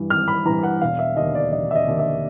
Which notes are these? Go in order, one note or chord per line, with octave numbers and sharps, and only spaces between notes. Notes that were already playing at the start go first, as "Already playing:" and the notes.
Already playing: G2 E3
G#1 F6
B5
G2 E3 A#5
F#5
E1 F5
E5
D#2 D3 D#5
D5
E1 D#5
E5
D#5
D#2 D3
E5